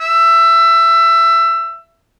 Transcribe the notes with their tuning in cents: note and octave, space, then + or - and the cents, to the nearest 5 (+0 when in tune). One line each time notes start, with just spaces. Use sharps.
E5 +20